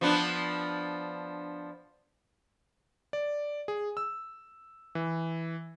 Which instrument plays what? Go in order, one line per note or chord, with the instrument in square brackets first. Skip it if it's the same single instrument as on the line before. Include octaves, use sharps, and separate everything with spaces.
[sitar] F3 B3 D4
[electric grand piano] D5
G#4
E6
E3